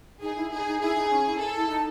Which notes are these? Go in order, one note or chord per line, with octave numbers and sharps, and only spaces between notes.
D#4 G#4
E4
D#4 G#4
D#4
E4 G#4
D#4
C#4
E4
A4
E4
D#4